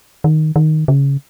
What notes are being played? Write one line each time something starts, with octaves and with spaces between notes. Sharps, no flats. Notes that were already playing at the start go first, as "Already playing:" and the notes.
D#3
D#3
C#3